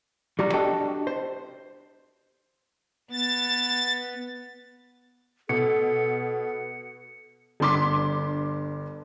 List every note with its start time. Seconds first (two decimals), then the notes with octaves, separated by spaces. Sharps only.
0.39 G3 F#4 A#5
0.53 D4 F#4 G4 A4 D#5 G5
1.07 C5
3.13 B3 A6
5.49 B2 A4 C#7
7.60 G1 G2 D4 C6 D6 B6